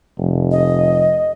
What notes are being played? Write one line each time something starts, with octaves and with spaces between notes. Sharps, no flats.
F1
D#5